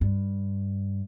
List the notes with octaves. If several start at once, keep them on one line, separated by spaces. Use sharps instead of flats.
G2